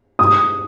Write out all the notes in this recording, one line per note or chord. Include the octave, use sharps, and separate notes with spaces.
D#6